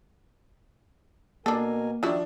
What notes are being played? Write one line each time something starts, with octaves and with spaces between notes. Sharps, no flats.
B2 A#3 D4 A4 A#4 G#5
D#3 F3 F#3 D4 E4